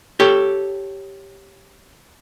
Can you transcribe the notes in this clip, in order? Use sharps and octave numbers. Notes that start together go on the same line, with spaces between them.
G4 A4 C#5